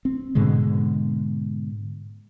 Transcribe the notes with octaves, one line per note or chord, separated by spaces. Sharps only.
C4
G#2 B2 D3 G#3